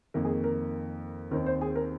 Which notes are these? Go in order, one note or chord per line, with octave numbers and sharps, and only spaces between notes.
F2 D#3 A#3 A#4
G#4
A#4
D#2 D#3 C4 A#4
C5
G#4
A#4